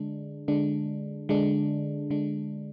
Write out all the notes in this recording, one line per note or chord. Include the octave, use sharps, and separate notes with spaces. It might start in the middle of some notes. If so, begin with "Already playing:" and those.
Already playing: D3 G#3 D4
D3 G#3 D4
D3 G#3 D4
D3 G#3 D4